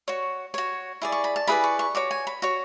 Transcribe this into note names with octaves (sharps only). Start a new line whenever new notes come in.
F#4 C#5 C#6
F#4 C#5
E4 G#4 D5
C#6
B5
A5
E4 G#4 B4 D5 B5
C#6
C#6
F#4 C#5 D6
G#5
B5
F#4 C#5 C#6